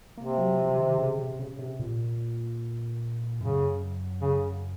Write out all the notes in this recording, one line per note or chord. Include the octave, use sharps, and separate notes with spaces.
C3 A#3
F#3
F3
D#3
C#3
C3
C#3
C3
A#2
F#2 C#3
C#3